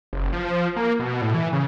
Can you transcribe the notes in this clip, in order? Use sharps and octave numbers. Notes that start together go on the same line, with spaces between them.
F#1
F3
A#3
B2
A2
E3
C#3